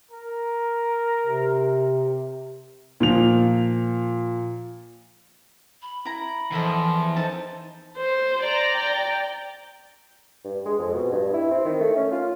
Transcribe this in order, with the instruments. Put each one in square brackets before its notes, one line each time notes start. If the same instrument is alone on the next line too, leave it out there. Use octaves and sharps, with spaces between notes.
[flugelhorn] A#4
[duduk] C3
[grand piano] A#2 F3 F7
[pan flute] B5
[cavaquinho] E4 A#5
[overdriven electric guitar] E2 [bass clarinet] F3 [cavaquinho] E4 A4 D#5
[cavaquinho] D#4 A4 A5 [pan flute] C5
[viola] C5
[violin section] D5 A#5
[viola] G5
[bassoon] G2
G#3
F2
B2
G2
E4
C4
D#3
A3
C#4
F4